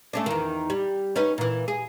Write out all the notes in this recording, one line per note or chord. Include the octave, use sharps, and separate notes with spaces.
A3 C#4 D4
E2 D#3
G3
C#4 D#4 B4
A#2 E3
G#4